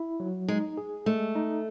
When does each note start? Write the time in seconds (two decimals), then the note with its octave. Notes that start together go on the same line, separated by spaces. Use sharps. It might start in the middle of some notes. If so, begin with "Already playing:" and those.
Already playing: E4
0.20 F#3
0.48 G#3 D#4
0.77 G#4
1.06 G#3 A3
1.35 D#4